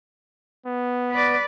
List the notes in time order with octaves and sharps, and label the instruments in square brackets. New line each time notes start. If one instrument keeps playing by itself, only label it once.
[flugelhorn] B3
[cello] B4 D5